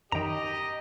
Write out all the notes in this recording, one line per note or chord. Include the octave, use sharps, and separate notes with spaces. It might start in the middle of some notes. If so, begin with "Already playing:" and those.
F#2 D#3 G4 D#5 G5 A#5